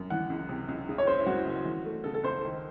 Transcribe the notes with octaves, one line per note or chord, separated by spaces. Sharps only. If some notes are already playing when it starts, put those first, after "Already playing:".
Already playing: F#2
E3 F#5
C#2
C3
C#2
C#3
C#5
F#1 C5
E4
F#2 F#4
F#1
E3
A3
C#3 A4
A4
C#2 C5
D#3